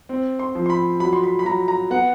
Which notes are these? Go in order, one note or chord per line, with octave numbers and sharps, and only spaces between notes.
C4
C6
F3
C6
B5
F#3 B5
C6
B5
B5
F#3 A#5
A#5
B3 F#5